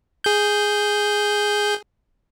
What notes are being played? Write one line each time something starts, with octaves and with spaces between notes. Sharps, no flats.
G#4 G6